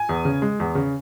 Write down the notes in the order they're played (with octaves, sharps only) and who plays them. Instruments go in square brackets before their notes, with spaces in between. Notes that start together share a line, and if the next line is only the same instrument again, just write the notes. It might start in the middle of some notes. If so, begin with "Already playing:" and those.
Already playing: [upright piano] G#5
E2
C#3
G#3
E2
C#3